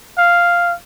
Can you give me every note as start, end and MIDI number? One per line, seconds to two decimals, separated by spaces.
0.18 0.74 77